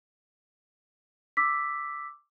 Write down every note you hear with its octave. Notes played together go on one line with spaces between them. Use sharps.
D6 E6 B6